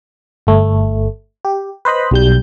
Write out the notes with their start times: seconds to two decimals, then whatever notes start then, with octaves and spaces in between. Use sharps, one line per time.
0.47 G1 A3
1.45 G4
1.85 B4 C5 D#5 B5
2.11 B1 G3 G6